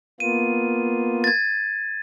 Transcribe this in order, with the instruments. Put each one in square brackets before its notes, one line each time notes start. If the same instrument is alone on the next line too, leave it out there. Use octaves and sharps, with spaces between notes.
[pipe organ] A#3 B3 F4 [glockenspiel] D#7
[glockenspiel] G#6 A6